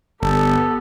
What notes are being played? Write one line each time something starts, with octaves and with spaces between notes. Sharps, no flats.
G1 B3 G4 A4